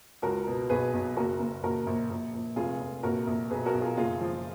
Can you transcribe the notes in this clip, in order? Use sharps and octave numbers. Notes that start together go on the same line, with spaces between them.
C#2 F#4 A#4
B2
B1 G#4 B4
B1
F#1 F#4 A#4
F#1
A#1 F#4 A#4
A#1
A#1
A#1
F1 F4 G#4
F1
A#1 F#4 A#4
A#1
B1 G#4 B4
F#4 A#4
B1
F4 G#4
F#1 F4 G#4
F3